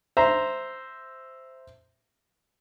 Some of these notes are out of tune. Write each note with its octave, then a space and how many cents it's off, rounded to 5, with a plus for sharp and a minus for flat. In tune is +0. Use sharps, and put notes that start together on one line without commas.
C5 -5 E5 +0 A#5 +0